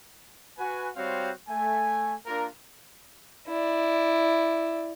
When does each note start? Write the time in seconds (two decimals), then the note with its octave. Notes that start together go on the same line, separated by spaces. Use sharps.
0.58 F#4 B4 G#5
0.97 G3 C4 F#4 C5 C#5 F5
1.48 A3 G#5
2.27 A#3 D4 F4 A#4
3.47 E4 D5